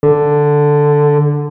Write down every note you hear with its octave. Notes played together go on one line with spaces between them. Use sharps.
D3